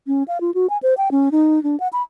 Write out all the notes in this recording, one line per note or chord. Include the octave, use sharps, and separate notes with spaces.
C#4
F5
F4
F#4
G#5
C5
G5
C#4
D#4
D4
F#5
B5